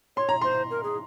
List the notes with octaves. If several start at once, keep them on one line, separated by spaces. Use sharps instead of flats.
C#5 C6
A#5
C5 C6
A#4
G#4